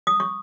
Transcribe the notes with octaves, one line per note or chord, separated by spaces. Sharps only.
D#6
C#6